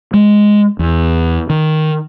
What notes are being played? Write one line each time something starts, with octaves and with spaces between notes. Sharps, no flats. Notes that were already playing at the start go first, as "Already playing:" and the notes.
G#3
E2
D#3